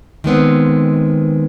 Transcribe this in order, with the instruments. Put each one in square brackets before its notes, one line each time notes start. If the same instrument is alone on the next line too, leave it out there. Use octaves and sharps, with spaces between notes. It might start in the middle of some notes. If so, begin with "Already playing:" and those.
[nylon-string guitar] D#3 G#3 B3 C4